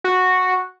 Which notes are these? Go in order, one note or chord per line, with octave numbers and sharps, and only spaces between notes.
F#4